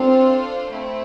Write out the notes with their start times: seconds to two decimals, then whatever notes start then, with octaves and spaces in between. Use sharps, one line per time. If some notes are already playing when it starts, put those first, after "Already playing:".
Already playing: C4 D4 F4 A4 C5 F5
0.70 A3 C4 E4